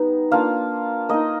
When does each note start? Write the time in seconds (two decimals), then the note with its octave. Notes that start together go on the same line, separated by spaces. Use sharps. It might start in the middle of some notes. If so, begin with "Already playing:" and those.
Already playing: G3 B3 D#4
0.32 A#3 D4 F4 F5
1.09 A#3 D#4 D#5